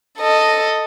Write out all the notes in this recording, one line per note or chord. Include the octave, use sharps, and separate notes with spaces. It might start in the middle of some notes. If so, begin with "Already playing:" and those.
A4 D#5